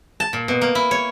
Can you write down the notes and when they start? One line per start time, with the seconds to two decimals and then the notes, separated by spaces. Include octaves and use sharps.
0.20 A5
0.33 A#2
0.48 B2
0.61 A#3
0.75 E4
0.91 C#5